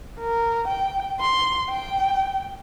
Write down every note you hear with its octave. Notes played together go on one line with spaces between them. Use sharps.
A#4
G5
C6
G5